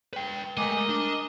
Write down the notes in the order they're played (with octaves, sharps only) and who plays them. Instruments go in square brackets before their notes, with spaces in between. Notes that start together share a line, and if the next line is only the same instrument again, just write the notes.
[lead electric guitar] B4 G5
[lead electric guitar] G#3 A3 [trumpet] A#4 [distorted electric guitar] D#5 [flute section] G#5 D6
[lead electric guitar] D4 [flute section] D6